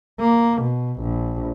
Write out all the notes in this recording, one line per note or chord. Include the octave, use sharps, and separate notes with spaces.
A#3
B2
A#1